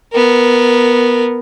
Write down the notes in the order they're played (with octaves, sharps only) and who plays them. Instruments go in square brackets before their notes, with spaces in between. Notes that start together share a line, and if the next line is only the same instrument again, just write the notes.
[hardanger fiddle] B3 A#4